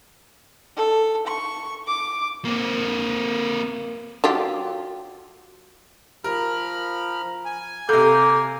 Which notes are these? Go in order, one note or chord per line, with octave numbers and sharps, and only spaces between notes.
A4
C#6
D6
A#3 C4
F#3 F4 G4
F3 A#4 B5 F6
G#5
C3 A#3 A4 G6